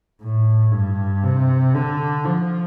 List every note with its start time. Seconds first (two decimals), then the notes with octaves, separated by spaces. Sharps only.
0.22 A2
0.72 G2
1.23 C3
1.74 D3
2.25 F3